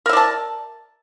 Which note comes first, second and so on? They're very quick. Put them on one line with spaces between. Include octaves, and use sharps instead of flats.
A#4 E5 D5 A5